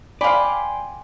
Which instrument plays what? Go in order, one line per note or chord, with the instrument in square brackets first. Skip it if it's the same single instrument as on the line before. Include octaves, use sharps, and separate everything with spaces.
[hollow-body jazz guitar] D5 [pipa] F5 B5 [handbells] G5 G#5 C6